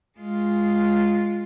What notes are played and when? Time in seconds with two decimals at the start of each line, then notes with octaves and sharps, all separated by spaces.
0.19 G#3 F4